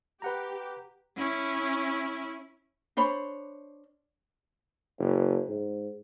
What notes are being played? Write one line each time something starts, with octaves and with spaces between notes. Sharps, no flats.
G4 B4 F#5 A#5
C#4 E4
D4 C5 C#5 B5
F#1
G#2